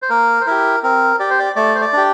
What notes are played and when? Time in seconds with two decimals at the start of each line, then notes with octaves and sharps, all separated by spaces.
0.02 C5
0.10 A#3 A#4
0.41 C5
0.46 E4 G4 A#4
0.83 C4 A#4
1.20 G4 D5
1.30 C5
1.39 D5
1.56 A3 D5
1.75 C5
1.81 D5
1.93 D4 G4